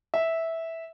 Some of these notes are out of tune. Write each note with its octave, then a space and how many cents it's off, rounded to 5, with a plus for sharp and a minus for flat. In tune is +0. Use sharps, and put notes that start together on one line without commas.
E5 -10